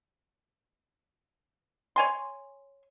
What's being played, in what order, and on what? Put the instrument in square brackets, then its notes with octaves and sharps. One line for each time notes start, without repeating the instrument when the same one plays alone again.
[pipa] C#5 G#5 C6